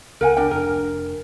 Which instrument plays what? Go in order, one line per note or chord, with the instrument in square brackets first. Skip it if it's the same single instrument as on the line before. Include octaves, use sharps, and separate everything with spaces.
[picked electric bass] C#2 [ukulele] A#4 F#5 G#5
[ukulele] D4 A#4 G5
[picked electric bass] F1 D4 [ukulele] A#4